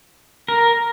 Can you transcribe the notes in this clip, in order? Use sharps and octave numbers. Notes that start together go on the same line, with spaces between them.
A#4